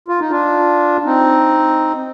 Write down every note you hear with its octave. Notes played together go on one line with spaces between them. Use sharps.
F4
D#4
D4 F4
C4 D#4